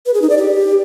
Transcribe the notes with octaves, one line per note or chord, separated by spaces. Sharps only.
B4
G#4
D#4
D5
G4